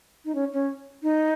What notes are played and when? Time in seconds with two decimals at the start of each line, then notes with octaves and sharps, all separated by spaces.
0.25 D#4
0.35 C#4
0.53 C#4
1.03 D#4